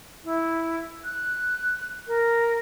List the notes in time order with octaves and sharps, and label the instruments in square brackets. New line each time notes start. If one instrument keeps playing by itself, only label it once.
[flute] E4
F#6
A#4